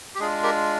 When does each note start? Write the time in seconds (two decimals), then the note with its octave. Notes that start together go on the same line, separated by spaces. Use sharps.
0.15 G4
0.19 G#3 D4 F4 G#4
0.43 G4 A#4